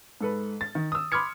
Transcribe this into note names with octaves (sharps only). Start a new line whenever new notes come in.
G#2 A4 B4
A6
D#3
D#6 E6
B5 C6 D6 F6 G#6 C#7